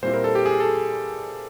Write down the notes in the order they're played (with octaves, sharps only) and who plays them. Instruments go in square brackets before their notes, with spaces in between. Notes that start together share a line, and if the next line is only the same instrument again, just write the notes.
[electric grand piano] A#2 G3 C4 E4 C5
A#4
A4
G4
G#4
A4